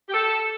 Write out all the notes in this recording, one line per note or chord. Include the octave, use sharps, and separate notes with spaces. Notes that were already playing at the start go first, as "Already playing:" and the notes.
G4
A4